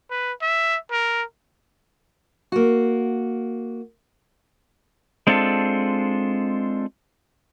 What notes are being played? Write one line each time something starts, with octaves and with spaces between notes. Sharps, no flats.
B4
E5
A#4
A#3 F#4
G#3 C4 D4 F4 A4